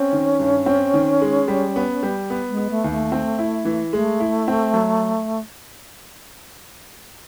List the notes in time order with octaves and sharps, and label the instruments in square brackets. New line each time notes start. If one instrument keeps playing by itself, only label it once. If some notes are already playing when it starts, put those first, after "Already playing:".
Already playing: [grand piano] C4 [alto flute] C#4
[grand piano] D#3
G2
C4
D#3
G#3
G3
B3
G3
B3
[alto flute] G#3
[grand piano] B3
[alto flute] A3
[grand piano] D#2
[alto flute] A3
[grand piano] C4
E4
E3
[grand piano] G#3 [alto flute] A3
[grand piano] E4
C4
F#3